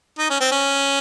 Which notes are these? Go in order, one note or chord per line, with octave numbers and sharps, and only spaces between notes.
D#4
C#4
C4
C#4